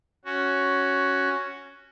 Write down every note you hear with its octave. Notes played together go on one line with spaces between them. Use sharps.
C#4 F#4